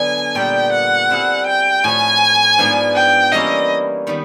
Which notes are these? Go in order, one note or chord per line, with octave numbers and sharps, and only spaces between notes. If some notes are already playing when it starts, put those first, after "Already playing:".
Already playing: D3 F#3 B3 D4 G#5
A#2 G3 B3 G5
F#5
G3 C4 E4 G#4
G5
A2 F3 A3 G#5
G#2 F3 G#3 B3 D4
G5
E3 G3 A#3 C#4 E4 D#5
D#3 G3 B3